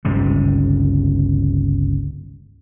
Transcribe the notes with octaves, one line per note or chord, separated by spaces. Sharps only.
G1 C#2 G#2 C3